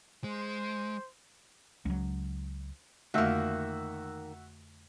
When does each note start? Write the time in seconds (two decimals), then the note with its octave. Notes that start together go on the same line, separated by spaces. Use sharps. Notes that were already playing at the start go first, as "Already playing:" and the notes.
0.24 G#3 C5
1.85 C#2 F#3
3.14 F2 D3 D#3 A3 A#3 F#4 E5